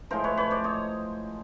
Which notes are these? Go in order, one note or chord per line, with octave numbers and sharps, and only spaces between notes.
A2 F3 G#3 A#4 C5
B4 C#5
B4 C#5
C5 D5
C#5 D#5